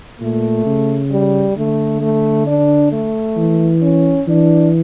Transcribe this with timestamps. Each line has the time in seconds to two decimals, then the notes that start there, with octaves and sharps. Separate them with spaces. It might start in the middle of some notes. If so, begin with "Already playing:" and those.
0.21 A#2 A3
0.66 C#3
1.11 G3
1.57 D3 A3
2.01 A3
2.47 D4
2.92 A3
3.37 E3
3.82 C#4
4.28 E3 D4